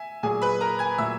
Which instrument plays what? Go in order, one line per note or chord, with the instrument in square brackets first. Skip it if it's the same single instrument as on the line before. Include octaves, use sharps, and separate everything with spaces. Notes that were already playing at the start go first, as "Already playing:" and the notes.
Already playing: [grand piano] E5 G#5
A#2 F#3 G#4 G#5
B4 B5
A#4 A#5
G#5 G#6
A#2 F#3 E5 E6